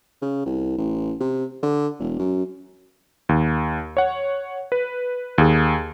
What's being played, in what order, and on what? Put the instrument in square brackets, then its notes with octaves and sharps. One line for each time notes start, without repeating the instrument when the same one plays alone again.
[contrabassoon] C#3
C2
A1
C3
D3
E1
F#2
[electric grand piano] D#2
C#5 F#5
B4
D#2 G#4